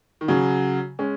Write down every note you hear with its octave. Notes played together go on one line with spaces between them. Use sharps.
D#3
C#3 F#3
G#3 C#4